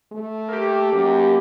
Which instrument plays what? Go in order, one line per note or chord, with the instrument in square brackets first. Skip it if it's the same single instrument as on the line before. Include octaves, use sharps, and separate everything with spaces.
[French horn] A3
[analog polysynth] A#3 G4
[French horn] F#2